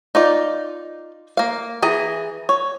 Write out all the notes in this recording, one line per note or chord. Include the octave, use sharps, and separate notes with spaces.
D#4 F4 D5
A#3 F5
E3 G#4 A#5
C#5